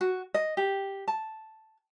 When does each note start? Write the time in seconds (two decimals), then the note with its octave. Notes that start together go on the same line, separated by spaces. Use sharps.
0.01 F#4
0.34 D#5
0.57 G4
1.08 A5